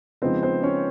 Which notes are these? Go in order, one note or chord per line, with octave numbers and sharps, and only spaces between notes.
C#3 F3 G#3 B3 C4 D#4 C5
C4 C5
C#4 C#5